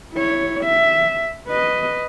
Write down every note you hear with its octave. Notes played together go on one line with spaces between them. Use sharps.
E4 C#5
E5
B4 D#5